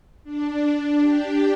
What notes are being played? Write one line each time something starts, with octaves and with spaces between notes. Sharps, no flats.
D4
G4